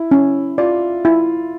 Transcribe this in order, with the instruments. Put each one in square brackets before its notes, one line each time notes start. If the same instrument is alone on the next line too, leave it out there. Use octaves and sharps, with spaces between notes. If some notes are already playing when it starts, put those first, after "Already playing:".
Already playing: [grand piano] E4
[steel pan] C#4
[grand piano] F4 [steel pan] D5
[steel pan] E4